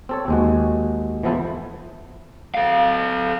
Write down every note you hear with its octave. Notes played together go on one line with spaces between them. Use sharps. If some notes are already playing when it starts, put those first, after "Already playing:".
C4 A4 C#5
D#2 G#3 F#4
E3 F3 B3 E4 A4 C5
A4 F5